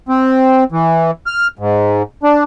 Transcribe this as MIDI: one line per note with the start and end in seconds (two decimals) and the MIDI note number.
0.09 0.64 60
0.72 1.11 52
1.26 1.48 89
1.59 2.02 44
2.23 2.44 62